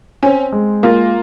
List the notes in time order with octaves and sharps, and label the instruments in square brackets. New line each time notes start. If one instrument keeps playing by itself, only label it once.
[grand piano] C4 [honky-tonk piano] C#4
[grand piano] G#3
[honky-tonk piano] A#3 [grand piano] F4